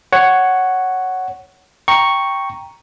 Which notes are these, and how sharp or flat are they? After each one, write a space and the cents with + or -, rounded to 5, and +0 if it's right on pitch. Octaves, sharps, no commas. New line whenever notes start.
C#5 +0 F#5 +5
G5 +0 A#5 +0 C#6 +0